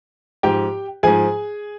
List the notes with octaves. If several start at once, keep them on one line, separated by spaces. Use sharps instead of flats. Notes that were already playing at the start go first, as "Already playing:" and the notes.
G#2 F3 G4 G5
G#2 F3 G#4 G#5